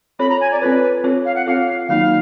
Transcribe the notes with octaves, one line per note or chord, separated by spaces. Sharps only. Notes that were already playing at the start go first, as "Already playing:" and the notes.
C4 F4 A4 C#5 B5
A#5
G#5
D5
C4 F4 A4 B4 C#5
C4 F4 A4 C#5
F5
F#5
C4 F4 A4 C#5 F5
D#3 F#3 A#3 D#4 F#4 F5